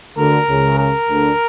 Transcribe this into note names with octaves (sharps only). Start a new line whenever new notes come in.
D2 D3 A#4
C#2 C#3
A#4
D2 D3